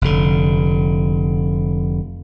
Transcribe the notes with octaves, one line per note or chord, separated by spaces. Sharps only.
F1 D3